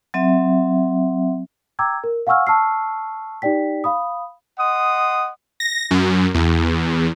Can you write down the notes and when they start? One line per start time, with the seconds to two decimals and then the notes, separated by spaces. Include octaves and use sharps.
0.14 F#3 C4 E5
1.79 G5 A#5 D6 E6 G#6
2.04 A#4
2.27 F5 F#5 G#5 C#6 E6 F6
2.47 A5 C#6 E6 F6 C7
3.42 D#4 G4 D5 G5 B6
3.84 F5 B5 D#6
4.59 D#5 F#5 C6 D#6
5.60 A#6
5.91 F#2
6.34 E2